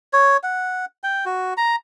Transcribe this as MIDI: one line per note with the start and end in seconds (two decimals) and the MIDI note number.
0.13 0.37 73
0.43 0.85 78
1.04 1.25 79
1.26 1.54 66
1.57 1.76 82